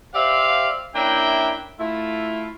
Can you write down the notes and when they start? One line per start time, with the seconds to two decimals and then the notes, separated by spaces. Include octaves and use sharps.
0.15 G4 C5 D5 E5 F5
0.95 A#3 C#4 D4 E4 E5 G5
1.79 A3 E4 F4